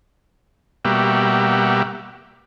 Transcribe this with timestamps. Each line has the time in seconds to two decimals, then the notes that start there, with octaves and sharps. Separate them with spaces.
0.85 B2 G3 A#3 F#4 G4 E5